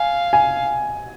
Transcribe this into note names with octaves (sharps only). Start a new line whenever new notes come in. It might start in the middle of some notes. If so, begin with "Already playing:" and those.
Already playing: F5 G#5
G#5